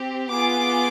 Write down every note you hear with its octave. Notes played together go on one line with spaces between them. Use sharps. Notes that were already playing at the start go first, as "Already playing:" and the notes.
Already playing: C4 G4
B3 F4 G#4 D6